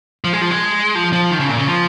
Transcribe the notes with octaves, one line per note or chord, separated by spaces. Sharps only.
F3
G#3
F3
G#3
F3
F3
D#3
C#3
A#2
C#3
F3